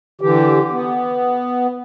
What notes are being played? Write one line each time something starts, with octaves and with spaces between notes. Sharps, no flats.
D3 E3 G4
B3